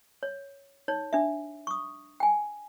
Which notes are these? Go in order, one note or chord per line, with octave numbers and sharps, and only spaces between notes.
C#5
D#4 C#5
D4 E5
C#6 D#6
G5 G#5